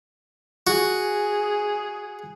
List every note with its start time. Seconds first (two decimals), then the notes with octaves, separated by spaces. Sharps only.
0.67 F#4 G#4